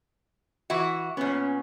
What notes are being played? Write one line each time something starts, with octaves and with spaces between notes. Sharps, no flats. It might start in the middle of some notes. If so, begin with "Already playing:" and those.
E3 E4 F#4
A#2 B3 C#4